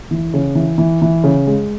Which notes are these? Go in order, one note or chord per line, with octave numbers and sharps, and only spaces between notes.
E3
C#3
E3
E3
E3
C#3
G#3